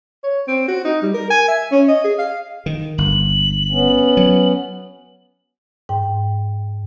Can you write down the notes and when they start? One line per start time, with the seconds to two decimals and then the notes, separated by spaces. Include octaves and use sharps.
0.24 C#5
0.48 C4
0.68 F#4
0.85 D#4
1.02 G3
1.14 A#4
1.30 G#5
1.48 E5
1.72 C#4
1.88 D#5
2.04 G#4
2.19 F5
2.66 D#3
2.98 G1 F#7
3.71 B3 C#4
4.17 F#3
5.89 G#2 G5